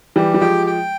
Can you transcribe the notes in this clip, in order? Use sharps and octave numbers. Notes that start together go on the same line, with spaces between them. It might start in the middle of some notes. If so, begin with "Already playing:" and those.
E3 G3 G4
G3
F3 G#3 G5
G5